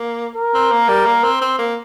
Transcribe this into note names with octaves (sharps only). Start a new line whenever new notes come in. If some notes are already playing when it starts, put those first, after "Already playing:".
Already playing: A#3
A#4
C4
A#3
G3
A#3
C4
C4
A#3